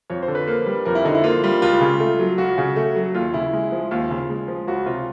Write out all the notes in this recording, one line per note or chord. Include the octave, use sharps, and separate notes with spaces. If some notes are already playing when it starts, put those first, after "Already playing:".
F2 C#5
C5
D3
B4
A#3
G3
F2 A#4
E4
D3 D#4
E4
A#3 F4
G3 F4
C#2 F4
C#3
A3
F#3
C#2 F#4
C#3
A3
F#3
D#2 F4
C#3 E4
G#3
F3
D#2 F4
C#3
G#3
F3
C#2 F#4
C3 F4